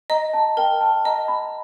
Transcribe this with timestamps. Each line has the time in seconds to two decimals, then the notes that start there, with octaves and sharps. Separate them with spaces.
0.10 D#5 A#5
0.33 A5
0.57 A#4 G5
0.81 A5
1.05 D#5 A#5
1.28 B5